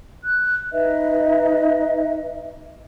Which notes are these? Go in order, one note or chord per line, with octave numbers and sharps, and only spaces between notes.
F#6
D#4 B4 D#5 E5